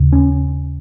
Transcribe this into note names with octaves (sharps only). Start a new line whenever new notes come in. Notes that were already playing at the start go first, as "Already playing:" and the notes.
Already playing: D#2 C#3
C#4